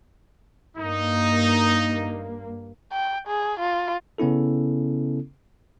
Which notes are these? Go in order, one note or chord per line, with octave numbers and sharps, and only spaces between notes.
G2 A#3 D#4
G5
G#4
F4
C#3 B3 C#4 E4 A4